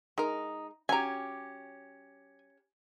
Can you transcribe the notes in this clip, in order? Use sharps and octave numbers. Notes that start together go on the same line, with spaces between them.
G#3 D#4 A#4
F#3 C#4 G4 G#5 A#5